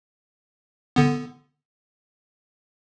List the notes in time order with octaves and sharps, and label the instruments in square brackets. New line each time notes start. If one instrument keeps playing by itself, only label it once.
[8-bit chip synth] D3 B3